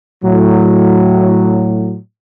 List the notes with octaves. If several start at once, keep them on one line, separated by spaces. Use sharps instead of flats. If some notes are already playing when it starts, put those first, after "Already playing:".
A2 F#3